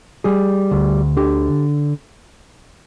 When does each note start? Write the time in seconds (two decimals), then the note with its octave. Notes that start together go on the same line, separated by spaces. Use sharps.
0.24 G3 G#4
0.71 D2
1.17 D3 G4